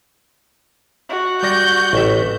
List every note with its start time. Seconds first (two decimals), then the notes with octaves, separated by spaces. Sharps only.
1.09 F#4
1.43 G3 D5 G6 A#6
1.93 A1 E5